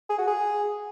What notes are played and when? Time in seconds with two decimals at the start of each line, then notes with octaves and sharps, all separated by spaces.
0.09 G#4
0.18 F#4
0.27 G#4